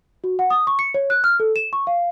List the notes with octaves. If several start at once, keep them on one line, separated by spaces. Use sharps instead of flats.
F#4
F#5
D#6
C#6
C#7
C#5
F#6
F6
A4
E7
C#6
F5